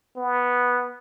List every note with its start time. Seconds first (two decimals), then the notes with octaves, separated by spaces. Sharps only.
0.17 B3